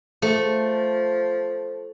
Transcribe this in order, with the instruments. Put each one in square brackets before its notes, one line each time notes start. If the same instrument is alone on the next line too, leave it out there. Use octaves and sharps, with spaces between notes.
[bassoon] F3 [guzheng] A3